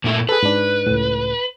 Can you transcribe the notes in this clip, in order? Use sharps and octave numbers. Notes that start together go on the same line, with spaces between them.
A#2 A3 E4
G#4 A4 B4
G#2 D4
C#2 A2